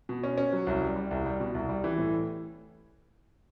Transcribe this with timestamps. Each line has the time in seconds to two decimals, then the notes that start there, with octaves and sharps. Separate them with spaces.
0.09 B2
0.24 C#4
0.38 C#4
0.53 F#3
0.67 C2
0.82 G3
0.96 G3
1.11 C2
1.25 G3
1.40 B2
1.55 C2
1.69 G3
1.84 E3
1.98 A2